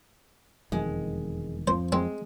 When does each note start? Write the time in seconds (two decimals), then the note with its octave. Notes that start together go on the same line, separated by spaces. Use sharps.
0.72 E1 F2 D#3 G#3
1.68 F2 F3 C5
1.92 G#3 C4